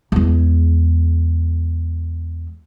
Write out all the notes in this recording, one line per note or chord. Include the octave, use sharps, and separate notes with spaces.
E2 G#3